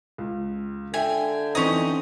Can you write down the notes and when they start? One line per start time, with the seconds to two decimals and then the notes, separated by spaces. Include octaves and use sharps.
0.18 C#2
0.94 D3 E5 G5 G#5
1.55 E3 C4 C#4 D#4 D#5